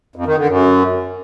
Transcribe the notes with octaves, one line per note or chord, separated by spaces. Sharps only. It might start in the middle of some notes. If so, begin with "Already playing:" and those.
F2
D#3
D3
F#2